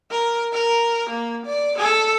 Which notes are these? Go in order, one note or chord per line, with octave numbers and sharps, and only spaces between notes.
A#4
A#4
A#3
D5
A4